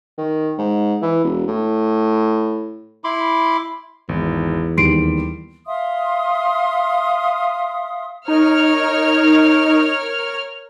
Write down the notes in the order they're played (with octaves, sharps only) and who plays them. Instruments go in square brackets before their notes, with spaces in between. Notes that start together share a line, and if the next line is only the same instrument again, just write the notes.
[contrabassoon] D#3
G#2
E3
E1
A2
[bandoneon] E4 B5 C6 D6
[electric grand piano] G#1 [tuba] E2
[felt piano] D#2 [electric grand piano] G3 [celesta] C6 C7 D7
[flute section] E5 F5 C6 D#6
[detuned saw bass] D#4 [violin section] A#4 C#5 F6